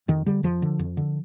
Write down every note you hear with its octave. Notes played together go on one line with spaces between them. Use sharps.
F2 D#3
D3 G3
F2 F3
D3
F2
D3